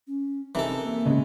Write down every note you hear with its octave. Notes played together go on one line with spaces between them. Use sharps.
C#4
C3 E3 D#4 A4 A#4 A#5
A#3
C#2 G#2 C#3 G#3 C#4 D#5